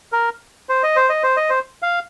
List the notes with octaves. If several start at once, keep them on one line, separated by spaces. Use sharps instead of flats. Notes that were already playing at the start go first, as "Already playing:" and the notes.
A#4
C5
D#5
C5
D#5
C5
D#5
C5
F5